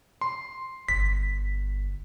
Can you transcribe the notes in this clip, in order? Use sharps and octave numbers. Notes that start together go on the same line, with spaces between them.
C6
G1 B6